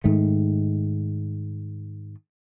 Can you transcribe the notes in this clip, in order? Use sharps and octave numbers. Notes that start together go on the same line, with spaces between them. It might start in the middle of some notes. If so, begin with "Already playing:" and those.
G#2 D#3 A3